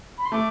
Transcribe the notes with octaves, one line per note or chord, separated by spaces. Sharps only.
B5
C6
A3 D6